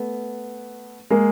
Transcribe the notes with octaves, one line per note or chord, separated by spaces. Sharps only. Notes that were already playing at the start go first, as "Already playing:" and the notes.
Already playing: A3 B3
G#3 A#3